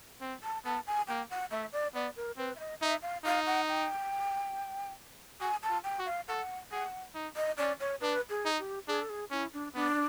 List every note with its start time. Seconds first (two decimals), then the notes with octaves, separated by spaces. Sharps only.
0.21 C4
0.43 A5
0.65 B3 A5
0.87 G#5
1.08 A#3 G5
1.30 F#5
1.51 A3 E5
1.73 D5
1.94 B3 D5
2.16 A#4
2.38 C4 B4
2.56 E5
2.60 D#5
2.81 D#4 E5
3.03 F5
3.24 D#4 F5
3.46 F#5
3.69 G5
5.41 F#4 G#5
5.63 A5
5.70 F4
5.84 G5
5.99 F#4
6.06 F5
6.28 A4 F#5
6.72 G#4 F#5
7.15 D#4
7.36 D#5
7.57 C#4 D5
7.80 C#5
8.01 D4 B4
8.30 G#4
8.45 D#4
8.59 G4
8.88 D4 G#4
9.02 A4
9.10 G#4
9.31 C#4 E4
9.53 D4
9.75 B3 D4